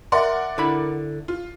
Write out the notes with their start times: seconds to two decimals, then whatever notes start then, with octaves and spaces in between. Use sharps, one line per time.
0.12 A#4 D5 E5 F#5 C6
0.58 D3 E4 B5
1.28 F4